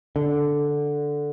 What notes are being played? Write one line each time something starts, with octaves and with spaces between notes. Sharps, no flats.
D3